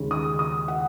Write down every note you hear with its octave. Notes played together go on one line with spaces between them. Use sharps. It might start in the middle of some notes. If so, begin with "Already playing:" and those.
Already playing: D#2 C#3 G#3
D#6
D#6
F#5